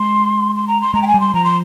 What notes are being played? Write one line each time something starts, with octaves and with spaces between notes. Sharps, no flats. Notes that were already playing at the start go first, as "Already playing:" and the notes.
Already playing: G#3 C6
C6
A#5
C6
G#3 A#5
G5
G#5
G3
C6
F3 A#5
C6